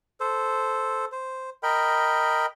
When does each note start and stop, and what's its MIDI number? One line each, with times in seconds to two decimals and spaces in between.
0.20 1.05 69
0.20 1.05 72
1.12 1.50 72
1.63 2.46 70
1.63 2.46 75
1.63 2.46 79
1.63 2.46 83